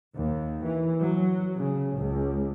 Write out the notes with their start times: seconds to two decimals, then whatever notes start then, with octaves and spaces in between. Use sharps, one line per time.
0.12 D#2
0.63 E3
1.02 F#3
1.57 C#3
1.96 C#2